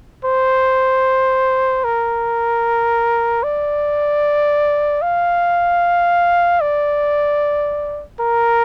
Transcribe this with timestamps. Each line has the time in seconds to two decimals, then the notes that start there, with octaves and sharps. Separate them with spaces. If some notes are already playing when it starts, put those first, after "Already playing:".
0.25 C5
1.84 A#4
3.43 D5
5.02 F5
6.61 D5
8.20 A#4